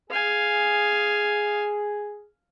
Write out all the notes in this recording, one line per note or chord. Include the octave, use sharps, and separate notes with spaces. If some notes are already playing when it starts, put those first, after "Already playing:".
G#4 F5 G#5